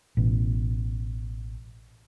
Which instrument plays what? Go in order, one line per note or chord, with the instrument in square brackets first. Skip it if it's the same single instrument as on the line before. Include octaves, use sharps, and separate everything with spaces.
[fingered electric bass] A1 B2